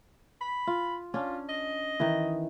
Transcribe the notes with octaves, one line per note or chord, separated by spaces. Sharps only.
B5
F4
C#4 D4 F4
D#5
D#3 E3